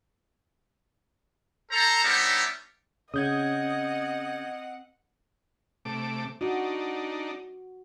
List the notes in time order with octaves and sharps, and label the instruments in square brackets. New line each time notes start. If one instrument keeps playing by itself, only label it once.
[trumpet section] A4 C5 A#5
G3 B3 D4 D#4 C#5 E5
[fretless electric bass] C#3 [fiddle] C4 F#5 [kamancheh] D#5 [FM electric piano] D#6 G6 G#6
[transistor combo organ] C3 A3 D6
[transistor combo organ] D4 D#4 [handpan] F#4